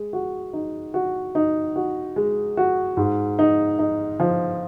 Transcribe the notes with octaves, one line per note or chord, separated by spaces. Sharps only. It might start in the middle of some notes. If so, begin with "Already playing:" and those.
Already playing: G#3
F#4
D#4
F#4
D#4
F#4
G#3
F#4
G#2
D#4
D#4
F3